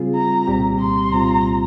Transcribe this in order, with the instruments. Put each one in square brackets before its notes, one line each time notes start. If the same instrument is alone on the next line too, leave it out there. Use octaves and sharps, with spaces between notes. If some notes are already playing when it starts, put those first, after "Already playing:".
Already playing: [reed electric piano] C#3 G3 C4 F4 G#4
[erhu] A#5
[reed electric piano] C2 A#2 G3 C4 G4
[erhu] C6
[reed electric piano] C2 A#2 G3 C4 F4 [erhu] A#5